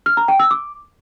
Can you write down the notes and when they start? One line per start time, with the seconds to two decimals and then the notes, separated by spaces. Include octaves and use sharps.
0.06 F6
0.17 A#5
0.28 G5
0.39 E6
0.51 D6